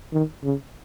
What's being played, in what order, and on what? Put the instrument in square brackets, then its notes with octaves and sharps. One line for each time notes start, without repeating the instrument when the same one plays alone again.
[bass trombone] D#3
C#3